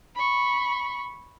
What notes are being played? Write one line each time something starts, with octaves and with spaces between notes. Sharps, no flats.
B5 C#6